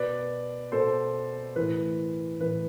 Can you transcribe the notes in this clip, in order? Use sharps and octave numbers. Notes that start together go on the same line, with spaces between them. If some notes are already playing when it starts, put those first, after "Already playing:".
Already playing: B2 B4 D5
B2 A4 C5
A2 E3 B4
A2 E3 B4